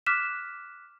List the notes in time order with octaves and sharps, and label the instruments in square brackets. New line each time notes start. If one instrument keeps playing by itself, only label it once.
[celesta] D6 F6 F#6 B6 E7